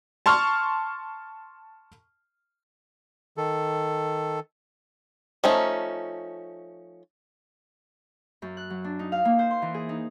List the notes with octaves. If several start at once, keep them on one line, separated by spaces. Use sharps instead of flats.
A5 C6 C#6 F6
D#3 A4
F3 A3 C#4 D#4
F#2
F#6
F#3
D4
D#4
F5
A#3
C5
C6
E3
G#4
D#4